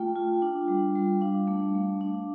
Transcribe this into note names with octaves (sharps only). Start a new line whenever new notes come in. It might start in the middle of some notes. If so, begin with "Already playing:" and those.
Already playing: A3 F4 G5
F4
D4
G3
G3
D4 F5
A3
A3
D4